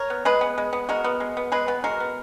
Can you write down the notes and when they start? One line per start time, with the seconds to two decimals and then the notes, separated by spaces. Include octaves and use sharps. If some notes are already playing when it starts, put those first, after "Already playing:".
Already playing: A#4 C#5
0.10 B3
0.25 G#3 G#4 B4
0.41 B3
0.58 G#3
0.73 B3
0.89 G#3 F#4 A#4
1.04 B3
1.20 G#3
1.37 B3
1.52 G#3 G#4 B4
1.68 B3
1.84 G#3 F#4 A#4
2.00 B3